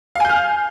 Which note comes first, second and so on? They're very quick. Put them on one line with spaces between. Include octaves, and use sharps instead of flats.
F5 G#5 G6 F6